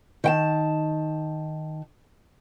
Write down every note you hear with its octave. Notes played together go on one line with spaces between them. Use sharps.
D#3 G5 A5